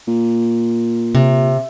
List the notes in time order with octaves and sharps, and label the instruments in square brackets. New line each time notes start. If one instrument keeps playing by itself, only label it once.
[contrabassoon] A#2
[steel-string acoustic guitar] C3